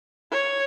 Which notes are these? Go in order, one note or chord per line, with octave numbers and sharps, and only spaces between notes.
C#5